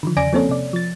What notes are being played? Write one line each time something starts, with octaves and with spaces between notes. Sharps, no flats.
D3 D#3 F3
E2 C#3 D5 G#5 A#6 D7
F3 A#3 C4 C#4 A4 C#5
C3 D5
F3 A6